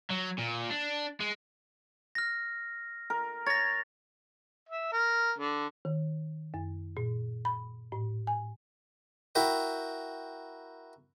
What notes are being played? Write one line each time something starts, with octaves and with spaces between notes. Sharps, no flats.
F#3
A#2
D4
G#3
F6 A#6
A#4
C#5 A6 A#6
E5
A#4
D3
D#3
F#2
A#2
B5
A2
G#5
E4 F#4 A#4 G5 B5